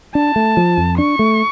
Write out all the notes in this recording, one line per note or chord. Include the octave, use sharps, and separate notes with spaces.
D4 A5
A3
F3
F2
D4 C#6
A3